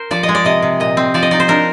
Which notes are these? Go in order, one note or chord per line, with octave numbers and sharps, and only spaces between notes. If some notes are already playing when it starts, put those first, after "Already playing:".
Already playing: A#4 C5
F3 D5
D#5
G#3
D5
C3 D#5
C3
A#2 D#5
C4
F3 D5
D#5
D#4 D5
C5
D4 A#4